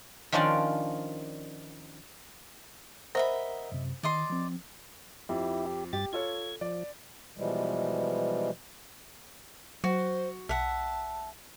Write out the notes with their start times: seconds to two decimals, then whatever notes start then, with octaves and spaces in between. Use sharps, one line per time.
0.32 D#3 F3 C#4 D4 F4 D5
3.15 A#4 C5 D#5 E5 F#5 A#5 B5
3.72 F#2 C3
4.03 D#3 D5 D#5 C6
4.30 F3 C4
5.29 F2 E4 G4
5.66 G4
5.93 G2 G4 A6
6.13 F4 A4 C#5 G#6
6.61 F3 D5
7.37 B2 E3 F3 G3 G#3
9.84 F#3 F#4 C5
10.49 B1 E5 F#5 A5